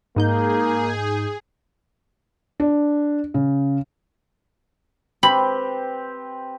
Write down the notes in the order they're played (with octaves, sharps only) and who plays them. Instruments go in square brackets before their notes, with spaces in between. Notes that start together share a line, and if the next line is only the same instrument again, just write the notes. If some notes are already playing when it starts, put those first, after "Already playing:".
[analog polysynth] G#2 D#4 G6 [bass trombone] A#3 [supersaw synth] G#4
[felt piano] D4
C#3
[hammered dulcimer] C4 G4 B4 [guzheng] B5